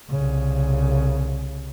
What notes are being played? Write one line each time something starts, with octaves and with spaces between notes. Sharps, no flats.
C2 C#3